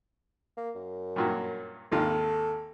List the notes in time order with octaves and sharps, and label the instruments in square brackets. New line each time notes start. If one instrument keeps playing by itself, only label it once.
[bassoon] A#3
F#2
[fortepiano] G2 A#2 F#3
[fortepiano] G#1 D#2 F4 [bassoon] A4